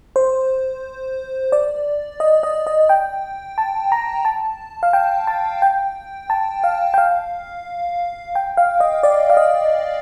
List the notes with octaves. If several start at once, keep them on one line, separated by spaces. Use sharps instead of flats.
C5
D5
D#5
D#5
D#5
G5
A5
A#5
A5
F5
G5
A5
G5
A5
F5
G5
F5
G5
F5
D#5
D5
F5
D#5